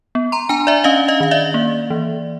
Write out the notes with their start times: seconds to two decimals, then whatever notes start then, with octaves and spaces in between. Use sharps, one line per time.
0.15 B3
0.32 A#5 C6
0.49 D4 G#5 A#5
0.67 D5 E5
0.84 C#4 D#5 F5
1.08 D#5 F5
1.20 D#3 F5
1.31 D5 E5
1.54 A#3
1.90 E3